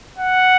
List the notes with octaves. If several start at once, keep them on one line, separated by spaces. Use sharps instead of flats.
F#5